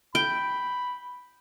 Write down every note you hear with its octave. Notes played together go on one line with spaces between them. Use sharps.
G5 B5